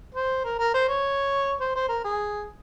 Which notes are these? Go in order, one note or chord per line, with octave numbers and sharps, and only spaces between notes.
C5
A#4
A#4
C5
C#5
C5
C5
A#4
G#4